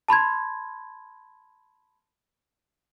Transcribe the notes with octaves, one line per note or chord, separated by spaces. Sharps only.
A5 B5 C6 G#6